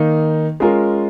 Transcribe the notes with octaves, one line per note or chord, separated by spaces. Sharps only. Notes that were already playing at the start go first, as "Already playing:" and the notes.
Already playing: D#3 A#3 D#4
G#3 C#4 F4 A#4